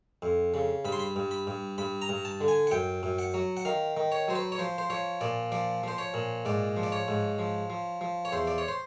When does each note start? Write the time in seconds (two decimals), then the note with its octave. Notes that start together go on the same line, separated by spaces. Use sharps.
0.22 F2
0.54 C#3
0.85 G2 B5
0.92 C6
1.00 B5
1.16 G2
1.31 B5
1.47 G2
1.78 G2 B5
2.02 A#5
2.09 G2
2.25 A5
2.41 D3
2.48 G#5
2.67 F#5
2.71 F#2 G5
3.03 F#2
3.19 F#5
3.34 F#3
3.57 F#5
3.65 D#3 F5
3.97 D#3
4.12 C#5
4.28 F#3 C5
4.35 B4
4.52 C#5
4.59 F3 C5
4.78 C5
4.90 F3 C#5
5.21 A#2 D5
5.52 F3 D5
5.83 F3 C5
5.98 C#5
6.14 A#2
6.45 G#2 D5
6.77 F3
6.83 D5
6.92 C#5
7.08 G#2
7.39 F3
7.70 F3
8.01 F3
8.25 C#5
8.32 E2 C5
8.47 D5
8.58 C#5
8.68 C5